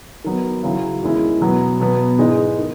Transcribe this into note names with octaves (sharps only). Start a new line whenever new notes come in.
D#3 F#3 B3
C#3 F#3 C#4 E4
E2 D#3 G#3 C#4 E4
B2 F#3 B3
B2 F#3 B3
G#2 E3 G#3 D#4
D#3